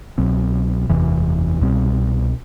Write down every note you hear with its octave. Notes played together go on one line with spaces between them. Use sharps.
C2 B2 F#3 C4
F#1 E2 C3 E3
C2 B2 G3 C4